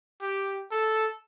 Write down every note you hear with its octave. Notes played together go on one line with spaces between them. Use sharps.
G4
A4